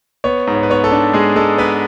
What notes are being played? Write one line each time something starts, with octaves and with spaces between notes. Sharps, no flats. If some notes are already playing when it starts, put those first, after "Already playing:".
B3 C#5
G#2
C#5
B4
B3 C#5
A4
D4
G#3 G#4
G#3 A4
B3 B4